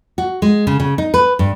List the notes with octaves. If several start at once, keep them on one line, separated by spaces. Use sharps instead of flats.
F#4
G#3
C#3
C#3
D#4
B4
G2